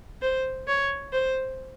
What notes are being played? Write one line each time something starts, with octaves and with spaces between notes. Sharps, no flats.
C5
C#5
C5